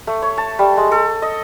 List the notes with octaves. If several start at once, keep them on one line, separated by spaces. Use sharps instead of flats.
A3
C#5
A5
G3
G#3
A4
D#5